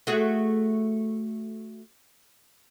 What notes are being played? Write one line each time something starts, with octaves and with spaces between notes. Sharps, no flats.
A3 F#4 G#4